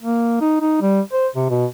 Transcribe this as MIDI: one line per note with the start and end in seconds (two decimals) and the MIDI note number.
0.01 0.40 58
0.41 0.59 63
0.61 0.80 63
0.81 1.01 55
1.12 1.28 72
1.36 1.47 48
1.49 1.66 47